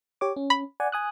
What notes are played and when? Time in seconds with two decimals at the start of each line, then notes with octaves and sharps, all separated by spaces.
0.21 G4 C#5 D6
0.36 C#4
0.50 B5
0.80 D5 F#5 G#5
0.92 G#5 D#6 F#6